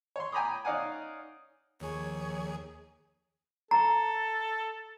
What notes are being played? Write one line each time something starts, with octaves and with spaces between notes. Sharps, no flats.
C#5 C6
G5 G#5 A#5 B5 D6 D#6
C#4 D#4 D5 F5 F#5 G#5
D#2 F3 G#4 C#5
A4 A#5